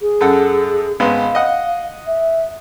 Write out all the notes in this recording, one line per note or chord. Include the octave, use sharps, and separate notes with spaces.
G#4
F#2 A4 F#5
G#1 G#3 B3 F5
D#5 F#5
E5